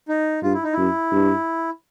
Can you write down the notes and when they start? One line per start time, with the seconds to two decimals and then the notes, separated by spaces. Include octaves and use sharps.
0.09 D#4
0.43 G2 F4
0.54 E4
0.64 D#4
0.73 F#2 E4
1.12 G2